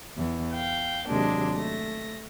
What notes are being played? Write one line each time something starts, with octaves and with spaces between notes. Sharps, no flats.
E2
F5 G5
D#2 C3 F#3 G#3 A#3 D4
A3 A#6